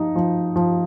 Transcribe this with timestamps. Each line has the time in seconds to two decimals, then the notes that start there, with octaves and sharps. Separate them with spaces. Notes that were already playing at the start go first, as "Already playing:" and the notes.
Already playing: F3 D#4
0.16 F3
0.56 F3